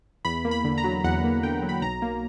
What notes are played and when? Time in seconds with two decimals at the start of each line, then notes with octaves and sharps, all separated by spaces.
0.25 E2 B5
0.45 A#3
0.51 B5
0.64 D3
0.78 A#5
0.84 F#3
1.04 E2 F#5
1.24 A#3
1.43 D3 G5
1.63 F#3
1.69 B5
1.82 B1 A#5
2.02 A#3